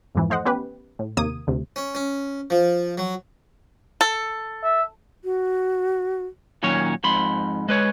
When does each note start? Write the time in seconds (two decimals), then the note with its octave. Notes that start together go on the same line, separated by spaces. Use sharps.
0.15 F2 G#2 E3 F3
0.30 A3 C5 D#5 F#5
0.45 B3 C#4 G4 B4
0.99 A2
1.17 D#2 C3 A#3 D#6 G#6 D#7
1.47 D2 C3
1.76 C#4
1.95 C#4
2.50 F3
2.98 F#3
4.01 A4
4.64 E5
5.24 F#4
6.63 A#2 D#3 F#3 C#4 C#5
7.04 F2 G#2 B5 C6
7.68 G#3 B4 C#5